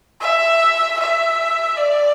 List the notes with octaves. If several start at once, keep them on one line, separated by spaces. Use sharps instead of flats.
E5
E5
D5